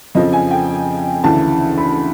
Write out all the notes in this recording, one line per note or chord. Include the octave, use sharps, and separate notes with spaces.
F2 C#3 F3 D#5
G#5
G5
D2 C#3 E3 A5
B5